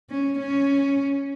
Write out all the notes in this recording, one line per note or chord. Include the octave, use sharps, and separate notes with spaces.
C#4
C#4